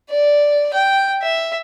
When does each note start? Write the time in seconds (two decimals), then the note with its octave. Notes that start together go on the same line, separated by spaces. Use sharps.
0.10 D5
0.73 G5
1.22 E5